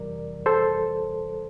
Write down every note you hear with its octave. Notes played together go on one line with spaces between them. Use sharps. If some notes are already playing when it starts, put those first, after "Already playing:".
Already playing: F2 C3 E3 G3 A#4 D5
A4 C5